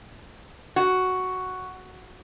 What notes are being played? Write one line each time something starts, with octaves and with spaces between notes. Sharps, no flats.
F#4